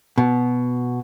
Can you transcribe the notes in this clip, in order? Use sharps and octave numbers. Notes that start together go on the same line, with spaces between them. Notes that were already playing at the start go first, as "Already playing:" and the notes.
B2